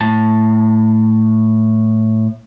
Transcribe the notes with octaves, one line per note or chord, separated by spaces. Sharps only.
A2 A5